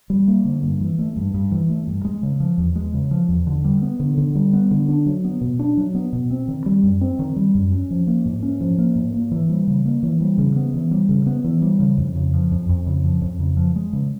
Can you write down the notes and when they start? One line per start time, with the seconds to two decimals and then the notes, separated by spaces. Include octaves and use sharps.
0.10 G3
0.28 A#3
0.45 D3
0.63 G2
0.81 E3
0.99 A3
1.16 G2
1.34 G2
1.51 E3
1.69 A3
1.87 G2
2.05 G#3
2.23 C#3
2.40 F3
2.58 E2
2.76 G#3
2.94 C#3
3.11 F3
3.29 E2
3.47 D3
3.64 G3
3.82 B3
4.00 D3
4.18 D3
4.35 G3
4.53 B3
4.71 D3
4.89 D4
5.06 F#3
5.24 B3
5.41 B2
5.59 D4
5.77 F#3
5.95 B3
6.13 B2
6.31 C4
6.48 D#3
6.66 G3
6.83 F#2
7.01 C4
7.19 D#3
7.36 G3
7.55 F#2
7.72 C#4
7.91 F3
8.07 A#3
8.25 G#2
8.43 C#4
8.60 F3
8.78 A#3
8.96 G#2
9.14 A#3
9.31 E3
9.49 G3
9.67 C#3
9.85 A#3
10.03 E3
10.20 G3
10.38 C#3
10.56 B3
10.74 E3
10.91 G3
11.09 C#3
11.26 B3
11.44 E3
11.62 G3
11.80 C#3
11.97 F2
12.16 C#3
12.34 F3
12.51 F2
12.69 F2
12.87 C#3
13.04 F3
13.22 F2
13.40 C#3
13.57 F3
13.75 G#3
13.93 C#3